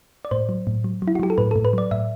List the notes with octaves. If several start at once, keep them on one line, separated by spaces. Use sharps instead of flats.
D5
A2 C5
F#3
A2
F#3
F#3
E4
F#4
F#3 G4
A4
A2 B4
A4
A2
B4
F#3 D5
A2 E5